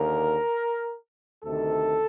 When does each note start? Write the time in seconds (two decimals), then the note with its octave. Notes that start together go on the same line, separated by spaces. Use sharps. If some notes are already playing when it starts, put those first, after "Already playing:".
Already playing: D#2 D3 A#4
1.44 D2 C3 D#3 A4